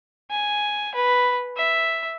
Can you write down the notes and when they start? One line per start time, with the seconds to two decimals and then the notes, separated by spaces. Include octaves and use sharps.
0.31 G#5
0.95 B4
1.57 E5